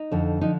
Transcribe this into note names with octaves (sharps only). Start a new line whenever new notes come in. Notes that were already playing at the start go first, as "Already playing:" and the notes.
Already playing: D#4
F2 D3 F3
D3 F3 D#4